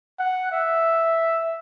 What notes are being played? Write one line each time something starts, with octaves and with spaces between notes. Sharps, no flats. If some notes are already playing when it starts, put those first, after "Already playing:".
F#5
E5